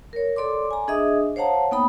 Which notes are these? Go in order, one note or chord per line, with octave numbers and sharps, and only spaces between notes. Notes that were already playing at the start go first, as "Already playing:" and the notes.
A#4 C#5
A4 D5 C6 D6
G#5 A#5
D4 G#4 D#5 E5 D#6
C5 C#5 F5 F#5 A5 A#5
A#3 B3 D#4 G5 B5 D#6